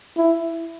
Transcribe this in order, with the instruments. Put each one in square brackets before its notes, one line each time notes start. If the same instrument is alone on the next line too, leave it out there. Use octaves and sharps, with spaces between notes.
[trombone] E4